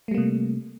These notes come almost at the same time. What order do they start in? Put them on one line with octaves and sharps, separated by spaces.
A3 G3 A#3 C3